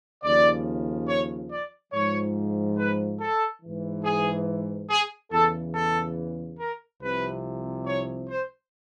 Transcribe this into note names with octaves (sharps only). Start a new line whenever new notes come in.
D#2 C#3 F3 D5
C#5
D5
G#2 F3 C#5
B4
A4
G#2 E3
G#4
G#4
E2 C#3 E3 A4
A4
A#4
C2 C3 F3 B4
C#5
C5